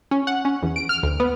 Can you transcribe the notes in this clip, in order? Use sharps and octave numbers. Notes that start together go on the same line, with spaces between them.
C#4
F#5
C#4
E2
D7
F6
D2
B3